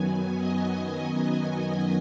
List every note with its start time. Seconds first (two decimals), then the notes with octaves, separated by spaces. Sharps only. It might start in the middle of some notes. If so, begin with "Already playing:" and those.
Already playing: F#2 D#3 F#3 B3 G#5
0.37 D#5